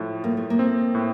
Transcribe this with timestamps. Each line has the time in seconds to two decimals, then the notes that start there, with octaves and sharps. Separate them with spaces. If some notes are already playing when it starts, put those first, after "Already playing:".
Already playing: A2 F3
0.24 A2 A#3
0.37 A3
0.50 A#3
0.59 C4
0.95 A2